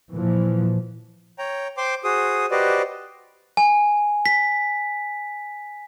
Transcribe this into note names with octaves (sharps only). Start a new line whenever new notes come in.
A#2 E3 F3
C#5 G5 A#5
C5 G5 C6 D6
F#4 G#4 C5 D#6
F#4 G4 B4 C5 D5 D#5
G#5
B6